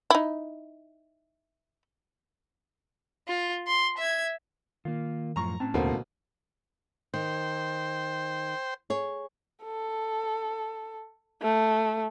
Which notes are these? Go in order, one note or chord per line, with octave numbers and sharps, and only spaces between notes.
D#4 E4
F4
C6
E5 G#6
D#3 A#3 F4
F#2 A2 F3 A#5 C#6
A2 C4 C#4 A5
D1 D#2 B2 A3 A#3 C5 F#5
D#3 C5 G5
G#4 C#5
A4
A3